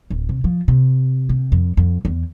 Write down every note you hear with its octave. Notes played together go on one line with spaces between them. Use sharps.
D1
C3
F3
C3
C3
F2
F2
E2